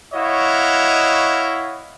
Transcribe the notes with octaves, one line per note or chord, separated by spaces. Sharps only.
E4 F#4 C#5 D#5 F5